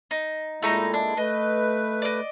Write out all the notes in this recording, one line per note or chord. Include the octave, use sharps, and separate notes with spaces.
D#4
A#2 G#3 A3 D#4 E4 A#5
D4
A3 B4 D#5
D5 D#5